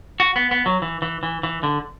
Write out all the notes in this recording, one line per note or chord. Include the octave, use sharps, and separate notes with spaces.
F#4
B3
B3
F#3
E3
E3
E3
E3
D3